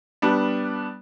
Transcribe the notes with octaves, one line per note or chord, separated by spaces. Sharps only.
G3 B3 D4